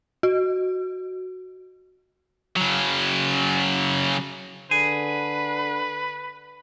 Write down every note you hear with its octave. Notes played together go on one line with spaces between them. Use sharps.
F#4
C#3 F#3
D3 G#4 B4